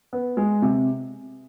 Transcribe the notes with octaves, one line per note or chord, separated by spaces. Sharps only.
B3
G#3
C3